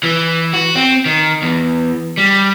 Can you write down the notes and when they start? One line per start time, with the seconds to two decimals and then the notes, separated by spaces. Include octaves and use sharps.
0.03 E3
0.53 F#4
0.75 C4
1.06 D#3
1.42 E2
2.18 G3